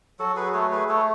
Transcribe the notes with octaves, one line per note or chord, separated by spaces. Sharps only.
F#3 F#4 A4
G#4 B4
A3 A4 C#5
G#4 B4
A3 A4 C#5